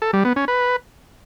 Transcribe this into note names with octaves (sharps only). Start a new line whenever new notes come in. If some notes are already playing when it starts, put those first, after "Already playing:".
A4
G3
B3
C#4
B4